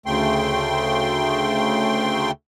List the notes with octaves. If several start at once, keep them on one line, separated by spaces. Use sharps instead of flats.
D2 C#3 A3 G5 C6